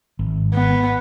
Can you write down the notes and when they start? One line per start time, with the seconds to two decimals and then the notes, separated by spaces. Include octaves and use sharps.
0.19 G#1
0.54 B3